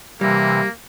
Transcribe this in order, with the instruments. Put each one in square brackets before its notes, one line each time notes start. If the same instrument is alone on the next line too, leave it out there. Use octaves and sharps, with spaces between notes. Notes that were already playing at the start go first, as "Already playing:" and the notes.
[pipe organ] C3 E3 [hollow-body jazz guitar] G3 [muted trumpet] A#3